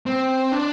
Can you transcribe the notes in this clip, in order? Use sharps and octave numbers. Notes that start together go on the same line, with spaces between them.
C4
D4